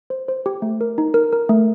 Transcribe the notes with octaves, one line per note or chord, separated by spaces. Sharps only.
C5
C5
G4
A3
A#4
D#4
A#4
A#4
A3